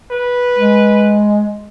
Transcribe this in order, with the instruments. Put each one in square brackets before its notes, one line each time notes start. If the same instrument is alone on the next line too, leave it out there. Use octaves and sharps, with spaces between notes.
[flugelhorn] B4
[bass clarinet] G#3